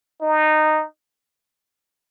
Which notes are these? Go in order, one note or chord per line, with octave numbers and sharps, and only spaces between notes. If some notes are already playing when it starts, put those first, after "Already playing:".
D#4